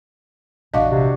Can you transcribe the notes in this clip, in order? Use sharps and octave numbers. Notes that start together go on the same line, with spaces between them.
E1 A#1 E2 D4 F#4 D#5 F5
C3